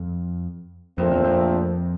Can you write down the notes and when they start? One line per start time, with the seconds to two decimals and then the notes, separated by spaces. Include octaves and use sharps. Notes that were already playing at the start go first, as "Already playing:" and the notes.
Already playing: F2
0.98 A#1 F2 A#2 A3 C4
1.11 E2
1.24 F2